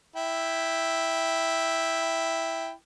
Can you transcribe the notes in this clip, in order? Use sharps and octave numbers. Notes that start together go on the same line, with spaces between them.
E4 G5